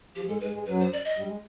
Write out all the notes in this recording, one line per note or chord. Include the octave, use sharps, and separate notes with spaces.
F2 F3 G4
G#2 G#3 A4
G#2 G#3 B4
G#2 G#3
F#2 F#3 B4
C5
D5
D#5
G2 G3
G#3